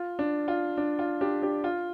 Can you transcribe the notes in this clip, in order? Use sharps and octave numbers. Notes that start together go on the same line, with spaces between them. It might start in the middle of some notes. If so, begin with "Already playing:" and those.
Already playing: F4
D4
F4
D4
F4
D4 G4
D4 G4
F4